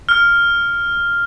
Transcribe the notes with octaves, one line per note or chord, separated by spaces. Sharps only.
F6